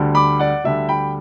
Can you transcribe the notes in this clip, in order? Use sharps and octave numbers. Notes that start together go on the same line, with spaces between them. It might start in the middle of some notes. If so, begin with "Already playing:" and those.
Already playing: D2 D3 G3
B5 D6
D5 F#5
D2 D3 G3 E5
G5 B5